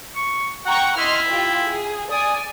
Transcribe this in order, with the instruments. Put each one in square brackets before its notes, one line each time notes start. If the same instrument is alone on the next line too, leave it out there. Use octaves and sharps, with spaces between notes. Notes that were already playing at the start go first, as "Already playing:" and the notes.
[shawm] C#6
[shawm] F#5 [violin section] G5 A#5 C#6
[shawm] E4 [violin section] D#5 C6 F6
[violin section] F4 G4 G5
G#4
[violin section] D5 G#5 [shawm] D#6